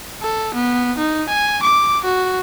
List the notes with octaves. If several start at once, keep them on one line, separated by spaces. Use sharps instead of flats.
A4
B3
D#4
G#5
D6
F#4